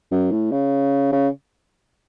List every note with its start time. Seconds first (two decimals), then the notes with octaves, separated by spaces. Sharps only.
0.11 F#2
0.31 A2
0.52 C#3
1.12 C#3